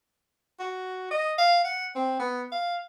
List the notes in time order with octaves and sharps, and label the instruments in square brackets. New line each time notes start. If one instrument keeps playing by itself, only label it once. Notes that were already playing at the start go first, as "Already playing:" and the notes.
[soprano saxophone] F#4
D#5
F5
F#5
C4
B3
F5